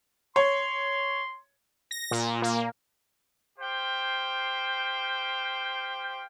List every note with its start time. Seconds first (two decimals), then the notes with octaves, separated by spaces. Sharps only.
0.36 C#5 C6
1.91 A#6
2.11 A#2
2.42 A#3
3.58 G4 C5 F5 G5